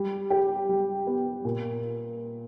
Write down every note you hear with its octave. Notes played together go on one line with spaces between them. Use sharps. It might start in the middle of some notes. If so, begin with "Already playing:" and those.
Already playing: G3
G4
G3
B3
A#2